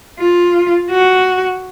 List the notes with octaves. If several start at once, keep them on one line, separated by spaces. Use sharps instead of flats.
F4
F#4